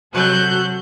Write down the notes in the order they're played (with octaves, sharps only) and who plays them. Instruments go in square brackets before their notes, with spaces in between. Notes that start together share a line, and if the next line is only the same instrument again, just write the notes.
[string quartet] C3 F#3 F#4 A4 F#6 G6